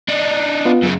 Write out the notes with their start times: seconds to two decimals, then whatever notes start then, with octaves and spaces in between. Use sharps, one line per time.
0.08 D4 D#4
0.65 B3 F4
0.83 F#2 C#3